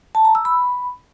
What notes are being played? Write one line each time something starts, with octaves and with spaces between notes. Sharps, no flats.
A5
A#5
E6
B5